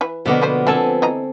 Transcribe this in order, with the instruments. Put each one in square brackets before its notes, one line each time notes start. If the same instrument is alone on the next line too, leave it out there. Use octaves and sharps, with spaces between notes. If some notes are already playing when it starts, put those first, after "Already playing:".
[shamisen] E3 B4
[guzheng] B2 D3 A#3 [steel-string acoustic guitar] F3 B3
[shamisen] A3 B4 C5
[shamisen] D3 A#3 A5 [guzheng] C4 A4 G#5
[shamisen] E3 D#5 A#5